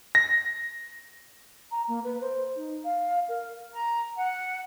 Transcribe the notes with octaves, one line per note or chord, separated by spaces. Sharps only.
A#6
A#5
A#3
B4
C5
D#4
F5
A#4
A#5
F#5